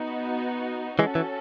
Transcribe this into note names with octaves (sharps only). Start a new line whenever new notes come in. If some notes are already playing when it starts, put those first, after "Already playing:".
Already playing: B3 D#4 F#4
E3 G#3 C#4 F#4 A4
E3